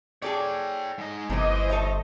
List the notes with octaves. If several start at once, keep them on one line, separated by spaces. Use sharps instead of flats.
G#4 A4 C#5 D5 G5
G#2 D#5
G1 C3 E3 A3 C5 D#5
A4 C#5 E5